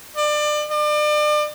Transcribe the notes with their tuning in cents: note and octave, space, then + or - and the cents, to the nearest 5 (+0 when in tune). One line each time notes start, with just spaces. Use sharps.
D5 +30
D5 +35